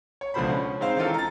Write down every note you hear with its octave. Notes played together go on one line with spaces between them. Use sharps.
C#5
C#2 B2 D3 F3 C5 B5
C#4
G#3 C4 D#4 C5 F5
D#3 E3 C4 D#4 F4 A4
A#5 A6